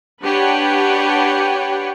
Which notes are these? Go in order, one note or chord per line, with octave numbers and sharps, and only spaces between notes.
D4 G4 B4 C#5 F#5 G5